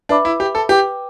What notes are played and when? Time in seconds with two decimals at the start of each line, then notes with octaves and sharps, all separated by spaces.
0.09 D4 B4 E5 B5 D6
0.25 E4
0.40 G4
0.55 A4
0.69 G4 B4 G5 D6